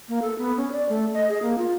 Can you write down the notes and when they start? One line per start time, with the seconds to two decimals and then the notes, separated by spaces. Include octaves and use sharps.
0.09 A#3
0.22 A4
0.38 B3
0.57 C#4
0.72 D5
0.89 A3
1.14 D#5
1.29 G#4
1.42 A#3
1.58 F4